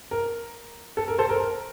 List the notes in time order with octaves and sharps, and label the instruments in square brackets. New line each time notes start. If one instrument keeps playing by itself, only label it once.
[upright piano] A#4
A4
A#4
A4 C5
A#4
A#4